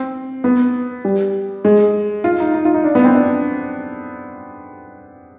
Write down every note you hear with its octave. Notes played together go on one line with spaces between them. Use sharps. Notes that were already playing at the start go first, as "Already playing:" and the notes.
Already playing: C4
B3
G3
G#3
F4
D#4
D#4
F4
D#4
D4
B3
C4
D4